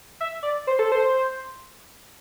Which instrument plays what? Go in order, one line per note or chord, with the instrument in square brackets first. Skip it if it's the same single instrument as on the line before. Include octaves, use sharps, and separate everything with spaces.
[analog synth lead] E5
D5
C5
A4
C5